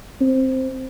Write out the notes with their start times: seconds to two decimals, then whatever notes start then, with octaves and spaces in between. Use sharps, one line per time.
0.21 C4